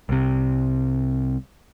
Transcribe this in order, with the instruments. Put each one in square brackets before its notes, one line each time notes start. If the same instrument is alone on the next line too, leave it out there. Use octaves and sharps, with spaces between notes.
[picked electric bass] C2 C3